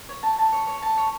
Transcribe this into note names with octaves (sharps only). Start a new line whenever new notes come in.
C#5
A5
A5
C#5
C#5
A5
C#5